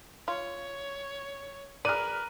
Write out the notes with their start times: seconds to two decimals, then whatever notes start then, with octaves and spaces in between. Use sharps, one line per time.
0.28 F4 C#5
1.85 G#4 A#4 B4 D5 F6 F#6 D#7